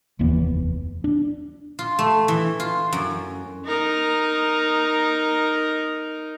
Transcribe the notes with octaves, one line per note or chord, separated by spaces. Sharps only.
F1 D#2 E3 B3
D4
F4
A3
E3
F4
F#2
D#4 A#4